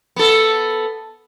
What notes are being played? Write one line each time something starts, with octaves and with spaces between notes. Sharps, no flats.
B3 A4